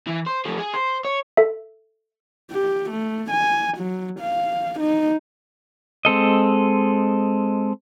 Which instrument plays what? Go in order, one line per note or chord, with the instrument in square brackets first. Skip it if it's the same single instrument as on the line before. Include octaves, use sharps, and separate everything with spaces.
[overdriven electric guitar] E3
C5
F3 A3
G#4
C5
C#5
[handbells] A4 E5
[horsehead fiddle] G4
A3
G#5
F#3
F5
D#4
[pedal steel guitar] G#3 C4 A4 D#5